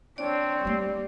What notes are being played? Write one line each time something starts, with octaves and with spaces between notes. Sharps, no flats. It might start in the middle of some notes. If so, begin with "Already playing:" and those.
C4 D4 C#5 D5
G3 A3 A#3